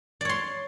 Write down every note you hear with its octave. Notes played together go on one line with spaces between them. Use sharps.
C#5 D5 C6